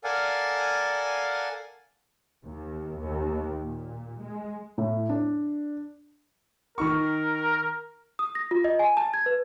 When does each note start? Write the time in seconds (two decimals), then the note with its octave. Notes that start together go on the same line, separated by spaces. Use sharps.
0.04 A4 A#4 D5 F5 F#5 G#5
2.44 D#2
3.01 D#2
3.59 A#2
4.22 G#3
4.78 A2
5.09 D4
6.78 D#3 D#4 A#4 C#6
8.19 D#6
8.35 A#6
8.51 F4
8.64 D#5
8.79 G#5
8.97 A5
9.14 G#6
9.26 B4